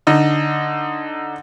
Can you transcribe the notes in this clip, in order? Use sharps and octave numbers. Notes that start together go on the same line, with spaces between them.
D3 D#4